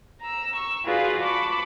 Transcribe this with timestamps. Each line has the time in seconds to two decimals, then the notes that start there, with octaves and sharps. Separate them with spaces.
0.22 A#5 E6
0.55 C#6 E6
0.85 F4 F#4 G#4 B4 D5 F5
1.21 A5 B5 C#6 D6